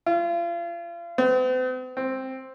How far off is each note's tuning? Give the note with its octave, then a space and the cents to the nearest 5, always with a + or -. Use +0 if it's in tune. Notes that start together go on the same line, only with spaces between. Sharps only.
F4 -35
C4 -45
C4 +5